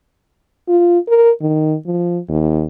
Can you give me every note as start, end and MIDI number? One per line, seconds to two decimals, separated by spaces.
0.69 0.99 65
1.08 1.31 70
1.41 1.76 51
1.86 2.18 53
2.29 2.65 39